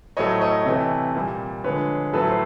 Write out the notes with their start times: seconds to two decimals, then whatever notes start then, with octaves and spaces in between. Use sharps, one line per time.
0.17 A2 F#3 A3 C#5 D#5
0.41 C#5 D#5
0.66 C3 E3 A3
1.15 A#2 G3
1.64 D3 F3 G#3 B4 C#5
2.13 A2 F#3 A3 A4 B4
2.30 C5